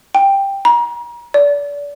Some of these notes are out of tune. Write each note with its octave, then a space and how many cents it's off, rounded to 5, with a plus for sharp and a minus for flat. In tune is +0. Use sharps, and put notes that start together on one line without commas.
G5 +5
A#5 +35
D5 -30